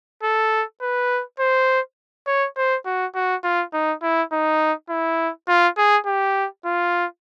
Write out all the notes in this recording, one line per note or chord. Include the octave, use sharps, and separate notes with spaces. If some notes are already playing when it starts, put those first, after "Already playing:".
A4
B4
C5
C#5
C5
F#4
F#4
F4
D#4
E4
D#4
E4
F4
G#4
G4
F4